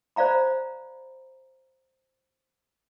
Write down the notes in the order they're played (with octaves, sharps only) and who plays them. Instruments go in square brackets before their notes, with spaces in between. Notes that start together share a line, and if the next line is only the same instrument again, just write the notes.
[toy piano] C5 D5 F5 A#5 B5